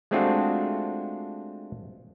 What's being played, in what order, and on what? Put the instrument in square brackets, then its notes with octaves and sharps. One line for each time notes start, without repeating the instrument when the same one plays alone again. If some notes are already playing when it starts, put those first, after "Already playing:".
[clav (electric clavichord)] G#3 A3 C4 D4 F4 F#4